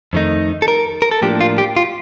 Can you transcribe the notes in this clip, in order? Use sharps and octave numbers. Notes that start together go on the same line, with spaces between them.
F2 D#3 A3 D#4
A4
A#4
A#4
A4
A2 F3 A#3 D4 G4
F4
G4
F4